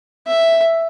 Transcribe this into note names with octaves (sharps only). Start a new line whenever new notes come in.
E5